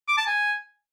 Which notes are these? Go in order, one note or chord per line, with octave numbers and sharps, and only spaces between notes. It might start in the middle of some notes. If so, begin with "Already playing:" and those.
D6
A5
G#5